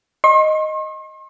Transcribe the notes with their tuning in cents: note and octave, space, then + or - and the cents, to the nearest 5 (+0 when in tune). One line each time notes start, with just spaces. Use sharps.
D#5 +0 C6 +45